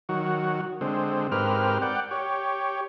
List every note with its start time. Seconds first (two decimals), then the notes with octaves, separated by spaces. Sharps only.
0.09 D#3 F#3 F#4
0.81 D3 G#3 C4
1.32 G#2 C4 G4 A#4 B4 F6
1.82 D5 F#5 G5
2.11 G4 C#5